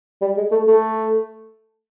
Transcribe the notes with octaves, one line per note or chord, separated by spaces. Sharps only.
G3
G#3
A3
A3